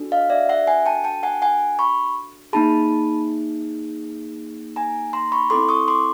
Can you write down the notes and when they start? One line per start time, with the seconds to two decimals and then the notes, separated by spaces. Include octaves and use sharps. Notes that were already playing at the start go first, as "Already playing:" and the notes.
Already playing: D4 F#4 A4
0.12 D#5 F5
0.30 D5 E5
0.49 E5 F#5
0.67 F#5 G#5
0.86 G5 A5
1.04 G5 A5
1.23 F#5 G#5
1.42 F#5 G#5
1.79 B5 C#6
2.53 A#3 D#4 G#4 A5 B5
4.76 G#5 A#5
5.13 A#5 C6
5.32 B5 C#6
5.50 C4 E4 A4 C6 D6
5.69 C#6 D#6
5.88 C6 D6